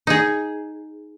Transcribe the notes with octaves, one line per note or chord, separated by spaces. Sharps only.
D#4 G#4